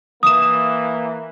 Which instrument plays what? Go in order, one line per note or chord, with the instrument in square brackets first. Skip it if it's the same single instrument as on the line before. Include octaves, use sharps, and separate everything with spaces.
[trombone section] E3 A#3 [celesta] D#6 E7